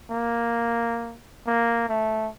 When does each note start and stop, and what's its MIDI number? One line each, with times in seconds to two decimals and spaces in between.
0.10 1.18 58
1.47 1.87 58
1.89 2.29 57